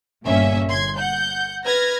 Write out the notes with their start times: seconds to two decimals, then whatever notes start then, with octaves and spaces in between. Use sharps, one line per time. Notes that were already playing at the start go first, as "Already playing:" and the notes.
0.24 G1 G2 A#2 A#3 C#4 E5
0.67 G1 C6 G#6
0.96 F#5 G6
1.63 B4 F6 G#6 A#6